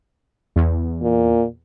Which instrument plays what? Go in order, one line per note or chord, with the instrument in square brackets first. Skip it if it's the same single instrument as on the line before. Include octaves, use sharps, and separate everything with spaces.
[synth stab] E2
[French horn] A#2